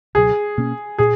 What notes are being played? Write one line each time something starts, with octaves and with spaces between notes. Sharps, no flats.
C#2 B2 F#3 G#4
B2 A#3 C#4
A#2 G#4